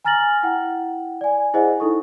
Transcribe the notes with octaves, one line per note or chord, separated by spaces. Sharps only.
G#5 A#5 F6 A6 A#6 F#7
E4 F#5 G5
D5 G#5
E4 G#4 C5 D#5 F#5 G#5
D#4 E4 A4 C#6